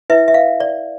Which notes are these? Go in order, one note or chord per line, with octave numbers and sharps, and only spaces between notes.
E4 B4 E5
E5
F5
D5